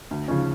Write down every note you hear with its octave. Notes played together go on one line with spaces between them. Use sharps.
D2
C#3 F3 C#4